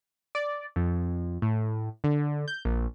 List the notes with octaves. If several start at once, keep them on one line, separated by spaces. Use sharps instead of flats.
D5
F2
A2
D3
G6
A#1